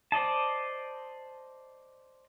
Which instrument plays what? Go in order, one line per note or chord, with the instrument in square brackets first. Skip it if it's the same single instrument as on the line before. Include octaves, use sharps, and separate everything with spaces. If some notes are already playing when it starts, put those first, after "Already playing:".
[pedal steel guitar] C5 D5 D#5 A5